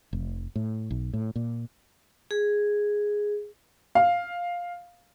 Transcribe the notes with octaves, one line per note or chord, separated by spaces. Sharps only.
F1
A2
B1
A2
A#2
G#4
F5